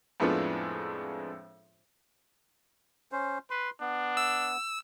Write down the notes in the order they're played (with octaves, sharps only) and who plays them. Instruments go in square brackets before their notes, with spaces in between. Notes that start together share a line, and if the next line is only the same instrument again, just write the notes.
[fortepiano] F2 A2 G#3 B3 D4 F4
[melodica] C#4 C5
[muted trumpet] B4 [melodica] C6
[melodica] B3 [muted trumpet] D4
[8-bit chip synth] E6